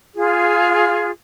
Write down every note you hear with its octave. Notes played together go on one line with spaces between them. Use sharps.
F4 G#4